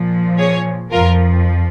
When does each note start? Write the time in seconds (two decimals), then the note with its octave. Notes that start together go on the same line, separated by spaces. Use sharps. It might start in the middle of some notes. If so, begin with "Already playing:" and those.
Already playing: A#2 F3
0.38 G#4 C#5
0.91 F2 F3 F4 A#4